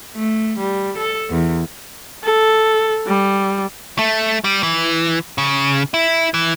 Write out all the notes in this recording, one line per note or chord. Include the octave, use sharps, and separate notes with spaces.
A3
G3
A4
E2
A4
G3
A3
G3
E3
C#3
E4
E3